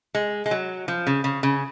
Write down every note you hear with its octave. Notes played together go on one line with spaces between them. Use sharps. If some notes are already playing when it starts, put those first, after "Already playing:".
G#3
G#3
F#3
F3
C#3
C#3
C#3